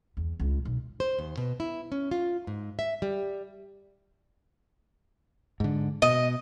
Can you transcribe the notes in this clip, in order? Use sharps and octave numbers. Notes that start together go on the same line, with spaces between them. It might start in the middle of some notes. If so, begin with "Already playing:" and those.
E2
C#2
B1
C5
D#2
B2
E4
C#4
F4
G#2
E5
G3
G#2 D3
B2 D#5